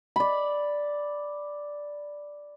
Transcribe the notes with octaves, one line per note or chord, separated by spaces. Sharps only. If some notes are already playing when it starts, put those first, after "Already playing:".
D5 B5